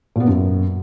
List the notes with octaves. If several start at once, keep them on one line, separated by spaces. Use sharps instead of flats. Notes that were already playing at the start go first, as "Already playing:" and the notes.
A#2 B3
F#2